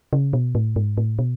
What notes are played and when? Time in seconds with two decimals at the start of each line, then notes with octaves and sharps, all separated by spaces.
0.13 C#3
0.33 B2
0.55 A2
0.76 G#2
0.98 A2
1.19 B2